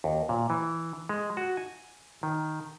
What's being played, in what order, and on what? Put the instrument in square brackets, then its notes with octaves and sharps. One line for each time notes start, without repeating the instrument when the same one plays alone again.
[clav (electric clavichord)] D#2
A#2
E3
G#3
F#4
G#5
D#3